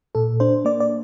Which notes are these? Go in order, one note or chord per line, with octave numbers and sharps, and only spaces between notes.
A#2 A4
D4 C5
A#3 D5
D5